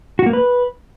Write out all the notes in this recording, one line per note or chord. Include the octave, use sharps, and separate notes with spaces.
F#4
A#3
B4